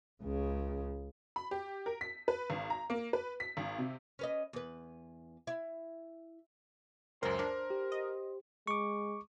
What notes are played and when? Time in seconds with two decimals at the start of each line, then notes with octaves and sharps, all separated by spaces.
0.23 C#2 C#3
1.36 B5
1.51 G4
1.86 A#4
2.01 B6
2.28 B4
2.50 G#1
2.70 A#5
2.90 A#3
3.13 B4
3.40 B6
3.57 G#1
3.78 C3
4.19 C#4 B4 D#5
4.53 E2 B4
5.47 E4
7.23 C#2 F#2 A#4 C5
7.39 D4 A#4
7.70 G4
7.92 D#5
8.67 G#3 C#6 D6